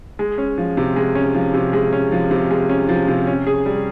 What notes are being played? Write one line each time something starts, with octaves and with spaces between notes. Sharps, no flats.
G#3
C#4
F3
C3
G#3
C#4
F3
C3
G#3
C#4
F3
C3
G#3
C#4
F3
C3
C#4
G#4
G3